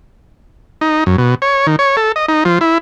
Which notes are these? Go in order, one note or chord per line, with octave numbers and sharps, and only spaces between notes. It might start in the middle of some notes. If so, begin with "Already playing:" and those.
D#4
F#2
B2
C#5
D#3
C#5
A4
D#5
D#4
F3
E4